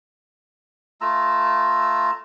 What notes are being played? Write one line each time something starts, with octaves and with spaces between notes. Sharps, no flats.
A3 F4 A#5 E6